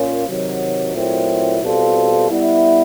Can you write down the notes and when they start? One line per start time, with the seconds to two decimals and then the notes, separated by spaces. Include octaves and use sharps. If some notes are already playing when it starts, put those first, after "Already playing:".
Already playing: A#2 A#3 C#4 F4
0.27 C3 D#3 F#3
0.94 A#2 F#3 A3 C4 E4
1.62 B2 G3 C4 F4 A4
2.29 G3 B3 E4